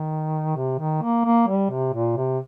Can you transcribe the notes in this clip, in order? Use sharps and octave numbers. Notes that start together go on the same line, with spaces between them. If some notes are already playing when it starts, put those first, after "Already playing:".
Already playing: D#3
C3
D#3
A#3
A#3
G3
C3
A#2
C3